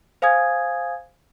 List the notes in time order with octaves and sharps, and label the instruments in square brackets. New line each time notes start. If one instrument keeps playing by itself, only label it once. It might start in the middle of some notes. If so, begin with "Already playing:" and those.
[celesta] C5 F5 G#5 D#6 G#6